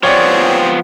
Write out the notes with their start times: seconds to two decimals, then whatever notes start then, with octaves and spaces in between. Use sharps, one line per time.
0.03 F3 B3 C4 G4 G#4 C#5 D5